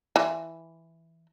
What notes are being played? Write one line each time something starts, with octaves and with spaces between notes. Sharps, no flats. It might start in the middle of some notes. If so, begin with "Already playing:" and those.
E3